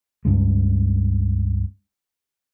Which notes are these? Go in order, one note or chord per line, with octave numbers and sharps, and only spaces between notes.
C#2 G2 C#3 G#3